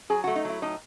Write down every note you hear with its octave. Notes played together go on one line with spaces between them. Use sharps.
F#3 G#4
A3 F#4
D#4
F#3 E4
A2 D#4